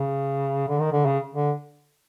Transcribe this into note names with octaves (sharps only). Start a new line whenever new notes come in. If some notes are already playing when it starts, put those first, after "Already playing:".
Already playing: C#3
D3
D#3
D3
C#3
D3